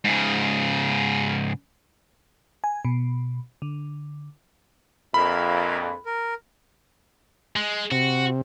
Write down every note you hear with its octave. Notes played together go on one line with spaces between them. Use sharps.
G#2 C#3
G#5
B2
D3
A#1 F2 A#4 E5 F5 B5
A#4
G#3
C3 F#4